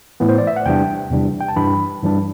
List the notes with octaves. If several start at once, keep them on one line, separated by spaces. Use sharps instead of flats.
A2 E3 B3
C5
D5
E5
F#5
E2 C3 E3 G3 D4 G5
E2 C3 E3 G3 D4
G5
A5
G2 E3 G3 D4 B5
G2 E3 G3 D4